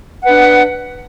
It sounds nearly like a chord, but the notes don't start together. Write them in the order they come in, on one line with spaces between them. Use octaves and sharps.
F#5 B4 D4